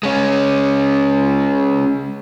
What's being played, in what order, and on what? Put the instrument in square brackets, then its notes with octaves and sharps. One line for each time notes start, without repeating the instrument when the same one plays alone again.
[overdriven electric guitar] G#3 C#4